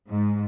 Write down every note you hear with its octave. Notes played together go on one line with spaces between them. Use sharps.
G#2